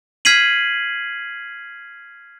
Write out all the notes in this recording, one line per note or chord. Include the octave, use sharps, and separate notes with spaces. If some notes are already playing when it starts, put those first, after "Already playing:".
F6 G#6 B6 C7 D#7 F#7